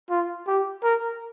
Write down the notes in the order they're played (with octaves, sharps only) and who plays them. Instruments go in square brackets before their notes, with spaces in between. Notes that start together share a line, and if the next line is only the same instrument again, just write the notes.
[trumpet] F4
G4
A#4